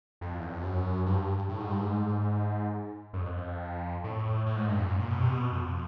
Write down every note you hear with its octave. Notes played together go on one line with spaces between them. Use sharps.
F2
E2
F2
F#2
G2
A2
G#2
G2
G#2
F#2
F2
A2
A2
G#2
G2
F2
F#2
A#2
B2
C3
B2
F2